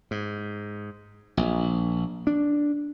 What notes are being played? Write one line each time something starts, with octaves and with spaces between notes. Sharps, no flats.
G#2
A#1
D4